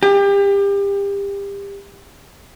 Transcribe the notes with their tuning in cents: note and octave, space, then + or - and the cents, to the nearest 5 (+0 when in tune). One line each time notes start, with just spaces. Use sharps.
G4 +30